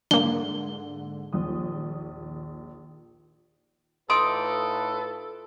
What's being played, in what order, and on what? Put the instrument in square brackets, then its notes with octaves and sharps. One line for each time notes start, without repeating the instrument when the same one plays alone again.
[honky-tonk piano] G#2 D3 [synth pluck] A#3 D4 [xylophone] G7
[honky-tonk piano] A#1 D#2 D#6
[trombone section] A2 F4 B4 [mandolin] D#4 D6 [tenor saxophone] A4 [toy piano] C6